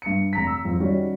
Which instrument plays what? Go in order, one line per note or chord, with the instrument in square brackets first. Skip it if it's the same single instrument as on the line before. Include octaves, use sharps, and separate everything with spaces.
[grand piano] G2 C#7
F1 A#5 B6
E6
F2 F3
D#3 G3 C#4 F#4 D5